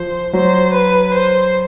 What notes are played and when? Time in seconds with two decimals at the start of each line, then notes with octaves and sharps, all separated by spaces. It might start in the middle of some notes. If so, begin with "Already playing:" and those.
Already playing: F3 C5
0.33 F#3 C5
0.73 B4
1.14 C5